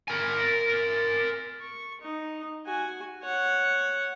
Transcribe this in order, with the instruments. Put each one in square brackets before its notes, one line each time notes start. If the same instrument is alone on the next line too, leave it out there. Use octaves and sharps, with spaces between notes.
[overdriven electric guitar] A#4 G#5
[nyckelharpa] C#6
D#4
F#4 G#5
C#5 F#5